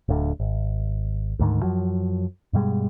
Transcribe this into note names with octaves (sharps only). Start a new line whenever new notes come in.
D1 D2 D3
G#1
D2 G#2 D#3
F#2 F3 F#3
G2 B2 G3 G#3